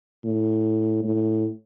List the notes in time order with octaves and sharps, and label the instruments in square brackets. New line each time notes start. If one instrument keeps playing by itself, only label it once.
[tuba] A2
A2